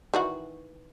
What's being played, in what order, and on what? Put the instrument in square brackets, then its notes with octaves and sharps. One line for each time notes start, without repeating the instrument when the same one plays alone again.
[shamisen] D#3 E3 F#4